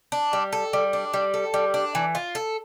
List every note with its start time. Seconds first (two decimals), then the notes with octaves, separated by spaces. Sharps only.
0.12 D4
0.33 G3
0.53 A4
0.73 G3
0.93 D4
1.14 G3
1.34 A4
1.54 G3
1.74 D4
1.95 E3
2.15 F4
2.35 A4